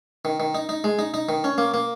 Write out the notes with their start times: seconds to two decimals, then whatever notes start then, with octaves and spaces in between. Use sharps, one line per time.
0.25 D#3
0.40 D#3
0.55 D#4
0.69 D#4
0.84 G#3
0.99 D#4
1.14 D#4
1.29 D#3
1.44 C#4
1.58 A#3
1.74 A#3